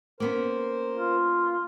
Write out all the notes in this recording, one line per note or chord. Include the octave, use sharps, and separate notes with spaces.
A#3 B3 C#4 A#4 C5
F4